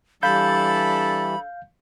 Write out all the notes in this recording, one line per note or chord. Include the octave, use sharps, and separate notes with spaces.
E3 G3 D4 A4 F5 B5 G6